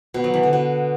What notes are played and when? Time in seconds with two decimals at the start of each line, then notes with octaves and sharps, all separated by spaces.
0.14 B2
0.24 F#3
0.34 E3
0.43 D3
0.53 B2